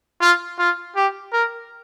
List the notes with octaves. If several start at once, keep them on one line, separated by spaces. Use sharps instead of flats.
F4
F4
G4
A#4